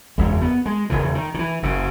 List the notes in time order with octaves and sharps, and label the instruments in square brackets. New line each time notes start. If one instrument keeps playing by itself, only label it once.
[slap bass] F#1 E2 C#3 G#3
B3
G#3
E1 D#2 C#3 E3
D#3
D#3
E3
F#1 F#2 C#3